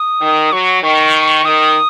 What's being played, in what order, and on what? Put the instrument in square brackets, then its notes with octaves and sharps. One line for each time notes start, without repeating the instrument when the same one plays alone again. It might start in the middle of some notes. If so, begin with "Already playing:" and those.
Already playing: [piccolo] D#6
[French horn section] D#3
[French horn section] F#3 [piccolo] C#6
[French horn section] D#3 [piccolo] C#6
[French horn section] D#3 [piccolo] D#6